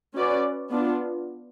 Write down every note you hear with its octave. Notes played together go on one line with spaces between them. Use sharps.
C#4 F#4 B4 D5
B3 D4 F4